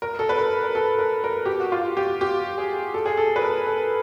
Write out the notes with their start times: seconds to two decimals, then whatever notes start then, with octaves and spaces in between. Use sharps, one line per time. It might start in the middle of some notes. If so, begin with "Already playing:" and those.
0.02 A#4
0.19 A4
0.29 B4
0.38 A#4
0.63 A#4
0.75 A4
0.99 A#4
1.24 A#4
1.45 G4
1.60 F#4
1.72 F4
1.97 G4
2.21 G4
2.58 G#4
2.94 A4
3.06 G#4
3.17 A4
3.36 B4
3.42 A#4
3.67 A4